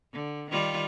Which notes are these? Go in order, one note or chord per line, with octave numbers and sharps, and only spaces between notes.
D3
D#3 G3 F4